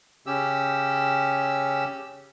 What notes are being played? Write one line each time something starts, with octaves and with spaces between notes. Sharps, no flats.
C#3 C#4 G4 E6